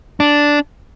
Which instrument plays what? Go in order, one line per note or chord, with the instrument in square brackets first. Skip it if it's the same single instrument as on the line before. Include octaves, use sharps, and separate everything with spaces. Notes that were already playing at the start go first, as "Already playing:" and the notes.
[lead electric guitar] D4